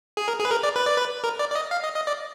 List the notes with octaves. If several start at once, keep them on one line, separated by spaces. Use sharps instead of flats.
G#4
A#4
G#4
B4
A#4
D5
B4
D5
B4
A#4
D5
D5
D#5
F5
D#5
D#5
D5